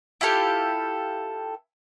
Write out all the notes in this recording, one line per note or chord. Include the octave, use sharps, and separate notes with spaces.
E4 F4 G4 A4